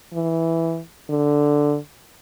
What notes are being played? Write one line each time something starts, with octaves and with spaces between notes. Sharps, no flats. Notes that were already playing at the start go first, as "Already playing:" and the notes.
E3
D3